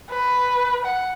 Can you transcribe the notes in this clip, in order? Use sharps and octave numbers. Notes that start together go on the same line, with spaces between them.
B4
F#5